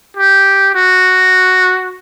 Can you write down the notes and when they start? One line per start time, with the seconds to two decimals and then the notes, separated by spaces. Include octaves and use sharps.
0.17 G4
0.75 F#4